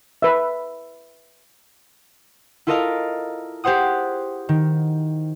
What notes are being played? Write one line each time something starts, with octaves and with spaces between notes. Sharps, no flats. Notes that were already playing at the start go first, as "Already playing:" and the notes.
B4 E5
E4 F4 A4 A#4 D#5 F5
G4 G#4 C5 F#5 D#6
D#3